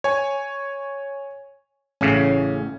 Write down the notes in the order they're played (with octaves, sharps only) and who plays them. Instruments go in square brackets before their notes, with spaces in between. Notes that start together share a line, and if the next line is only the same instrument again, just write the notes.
[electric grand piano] C#5 G#5
[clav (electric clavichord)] A1 A2 C#3 [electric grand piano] C#4